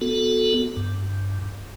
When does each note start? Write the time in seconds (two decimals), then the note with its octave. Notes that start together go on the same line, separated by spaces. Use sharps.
0.01 B3 F#4 A4
0.77 G2